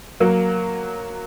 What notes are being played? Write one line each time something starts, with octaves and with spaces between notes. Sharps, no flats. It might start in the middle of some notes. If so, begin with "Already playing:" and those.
F#3 A#3